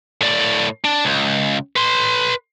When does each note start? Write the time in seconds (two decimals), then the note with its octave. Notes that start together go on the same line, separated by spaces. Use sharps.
0.21 A2 D5
0.84 D4
1.05 C#2
1.76 B4 C6